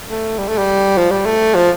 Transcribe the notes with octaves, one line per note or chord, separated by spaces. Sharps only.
A3
G3
A3
G3
F3
G3
A3
F3